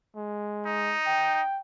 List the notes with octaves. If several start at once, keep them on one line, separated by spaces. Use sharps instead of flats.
G#3
D#4
G5